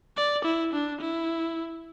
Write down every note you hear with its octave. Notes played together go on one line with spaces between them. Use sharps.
D5
E4
D4
E4